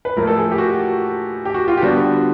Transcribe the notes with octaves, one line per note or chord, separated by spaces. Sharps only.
B4
A2 F3 A3 A#4
A4
G#4
G4
F#4
G4
F#4
F4
G4
D3 G3 B3 D4 F#4